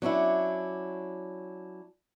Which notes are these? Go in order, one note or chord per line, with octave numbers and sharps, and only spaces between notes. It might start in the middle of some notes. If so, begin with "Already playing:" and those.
F#3 C#4 D4 E4